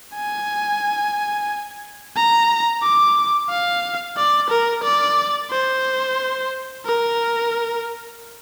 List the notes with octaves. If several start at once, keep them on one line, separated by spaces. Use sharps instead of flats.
G#5
A#5
D6
F5
D5
A#4
D5
C5
A#4